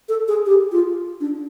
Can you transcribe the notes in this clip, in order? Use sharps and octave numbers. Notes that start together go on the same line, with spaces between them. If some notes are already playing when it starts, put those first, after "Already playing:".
A4
G#4
G4
F4
D4